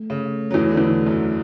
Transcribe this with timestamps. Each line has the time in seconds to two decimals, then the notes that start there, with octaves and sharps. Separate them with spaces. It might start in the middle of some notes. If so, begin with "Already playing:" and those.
Already playing: A3
0.10 C#3
0.51 F#3
0.54 E2 E3
0.71 D3
0.77 E2 E3
1.07 F#2 F#3